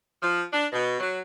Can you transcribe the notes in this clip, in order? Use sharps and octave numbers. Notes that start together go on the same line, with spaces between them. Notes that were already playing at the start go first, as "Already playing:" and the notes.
F3
D4
B2
F#3